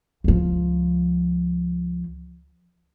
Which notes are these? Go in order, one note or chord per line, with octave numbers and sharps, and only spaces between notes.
C#2 F3